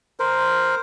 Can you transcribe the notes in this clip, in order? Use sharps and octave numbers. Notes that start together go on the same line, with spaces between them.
A#4 C5